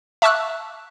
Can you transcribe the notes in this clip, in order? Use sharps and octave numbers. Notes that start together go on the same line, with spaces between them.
E5 A5 C#6 D6 E6 F#6